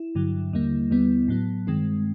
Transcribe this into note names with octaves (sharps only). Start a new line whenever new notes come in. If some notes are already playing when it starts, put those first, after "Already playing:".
Already playing: E4
G2 D3 F#3
D#2 D3 G3 A#3
D#2 D3 G3 B3
A2 F#3 B3
G2 D#3 G#3 C4